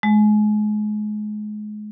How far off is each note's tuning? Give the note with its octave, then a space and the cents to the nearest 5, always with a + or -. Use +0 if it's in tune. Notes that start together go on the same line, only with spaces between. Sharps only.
G#3 +30